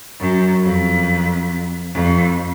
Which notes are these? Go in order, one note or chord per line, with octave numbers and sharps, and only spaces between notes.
F#2
F2
F2